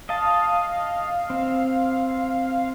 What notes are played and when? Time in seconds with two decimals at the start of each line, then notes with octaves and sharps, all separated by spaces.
0.09 D#5 F5 A5
1.30 C4